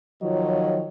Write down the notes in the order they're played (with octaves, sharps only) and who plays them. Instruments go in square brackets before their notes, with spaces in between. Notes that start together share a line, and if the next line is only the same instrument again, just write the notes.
[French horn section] D#3 F3 F#3 F4 C#5 D#5